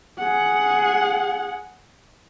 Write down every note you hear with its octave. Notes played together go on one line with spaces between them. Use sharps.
G#4 F#5